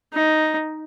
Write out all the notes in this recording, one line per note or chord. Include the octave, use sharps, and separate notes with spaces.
D#4